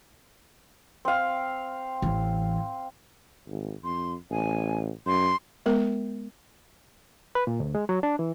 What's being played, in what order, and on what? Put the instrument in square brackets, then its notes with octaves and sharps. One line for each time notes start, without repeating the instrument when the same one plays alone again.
[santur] C4 F5
[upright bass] A1 E3
[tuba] G#1
[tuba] F2 [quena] C6
[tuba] A1 [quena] G#5
[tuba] F#2 [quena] C6
[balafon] G#3 B3 A#4
[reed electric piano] B4
A#2
D2
G#3
F#3
D4
E3